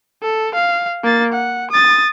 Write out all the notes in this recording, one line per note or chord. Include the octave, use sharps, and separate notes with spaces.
A4
F5
A#3 A6
F#5
D#6 A6